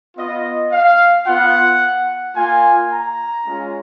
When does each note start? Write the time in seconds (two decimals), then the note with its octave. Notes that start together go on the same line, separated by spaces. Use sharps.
0.17 B3 F4 D#5
0.72 F5
1.26 B3 F4 F#5
2.35 A#3 F4 G#5
2.90 A#5
3.45 G#3 C#4 F4